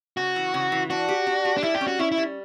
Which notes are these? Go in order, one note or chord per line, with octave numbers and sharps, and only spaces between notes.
C#3 F#4
E3
C#3
E3
D4 F#4
G4
D4
G4
D4
G3 E4
G4
C#4
F#4
C#4 E4
E4
G3